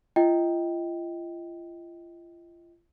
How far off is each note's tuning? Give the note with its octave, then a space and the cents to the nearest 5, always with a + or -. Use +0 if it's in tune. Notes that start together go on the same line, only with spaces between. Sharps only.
F4 -40 D#5 +25 G5 +0